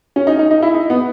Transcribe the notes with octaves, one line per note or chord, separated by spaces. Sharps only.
C#4
D#4
D#4
D#4
E4
D#4
B3